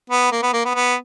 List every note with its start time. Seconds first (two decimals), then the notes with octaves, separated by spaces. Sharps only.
0.10 B3
0.32 A#3
0.42 B3
0.53 A#3
0.65 B3
0.75 B3